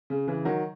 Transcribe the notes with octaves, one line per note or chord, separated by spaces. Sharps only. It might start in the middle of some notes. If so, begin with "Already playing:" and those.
C#3
C#3 E3
D#3 F#3